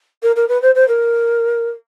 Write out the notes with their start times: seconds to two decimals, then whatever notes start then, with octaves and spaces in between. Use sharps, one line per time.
0.23 A#4
0.36 A#4
0.48 B4
0.62 C5
0.75 C5
0.88 A#4